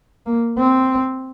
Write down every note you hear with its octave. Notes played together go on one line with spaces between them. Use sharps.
A#3
C4